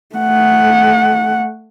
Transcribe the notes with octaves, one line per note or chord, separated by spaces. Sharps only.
A3 F#5